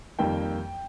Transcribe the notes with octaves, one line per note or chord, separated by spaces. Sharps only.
F2 D#3 G3 A#3 G5